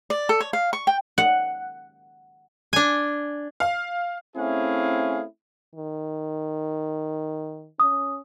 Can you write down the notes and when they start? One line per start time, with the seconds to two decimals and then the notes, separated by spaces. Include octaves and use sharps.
0.10 D5
0.29 A4
0.40 C#5
0.53 F5
0.73 C#6
0.87 G5
1.18 F#5
2.73 D4 G#5
3.60 F5
4.36 A3 C4 C#4 E4 G#4 F5
5.75 D#3
7.80 C#4 D#6